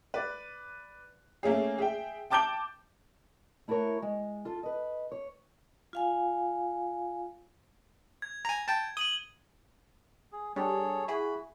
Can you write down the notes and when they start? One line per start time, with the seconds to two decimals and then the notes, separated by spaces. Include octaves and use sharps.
0.14 B4 D5
1.43 A3 A#3 C#4 G#4
1.78 G#4 E5 G5
2.30 G5 A5 D6 G6 D7 G7
3.68 A3 E4 F#4 A#4 C#5
4.02 G#3
4.45 F4 A4
4.63 B4 D#5
5.12 C#5
5.93 F4 F5 G#5
8.22 G#6
8.45 G#5 A#5
8.68 G5 A5
8.97 D#6 D#7 F#7 G7
10.32 G#4
10.56 G3 D4 G#4 A4 C#5
11.08 E4 F#4 G#4 B5